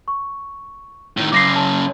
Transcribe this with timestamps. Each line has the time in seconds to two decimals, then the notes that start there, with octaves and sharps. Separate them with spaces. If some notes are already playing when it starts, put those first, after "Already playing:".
0.08 C#6
1.17 A2 D#3
1.32 F#2 C#3 D6 A#6 C7
1.56 A5